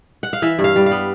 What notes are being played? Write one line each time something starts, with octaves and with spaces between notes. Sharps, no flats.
F#5
F5
E3 E5
G2
F5
G3
F5
B3